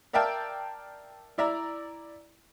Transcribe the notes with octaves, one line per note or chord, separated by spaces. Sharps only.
A#4 D5 E5 F5 G5 A5
E4 D5 E5 A#5